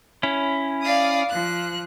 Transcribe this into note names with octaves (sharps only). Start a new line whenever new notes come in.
C#4 E4
D5 F5 D#6
F3 F#6